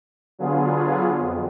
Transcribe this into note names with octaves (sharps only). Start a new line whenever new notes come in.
D3 F#3 B3 F4 G#4
F2